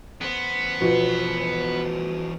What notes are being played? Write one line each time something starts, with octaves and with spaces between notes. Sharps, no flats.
E2 B3 C5
B2 F3